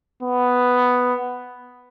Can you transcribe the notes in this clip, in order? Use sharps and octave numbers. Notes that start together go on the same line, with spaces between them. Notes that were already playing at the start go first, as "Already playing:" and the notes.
B3